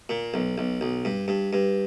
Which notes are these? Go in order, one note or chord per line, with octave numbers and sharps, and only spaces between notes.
A#2
B1
B1
B1
G2
G2
G2